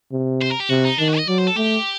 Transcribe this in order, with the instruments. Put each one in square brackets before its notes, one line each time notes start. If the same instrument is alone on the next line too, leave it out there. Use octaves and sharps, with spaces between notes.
[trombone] C3
[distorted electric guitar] C5
A#4
G4
[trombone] C3 [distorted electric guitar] F#4
[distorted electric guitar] D#4
[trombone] D#3 [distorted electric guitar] D4
[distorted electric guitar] F#4
D#5
[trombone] F#3 [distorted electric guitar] D5
[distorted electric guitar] C5
A4
[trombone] A3 [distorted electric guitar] G4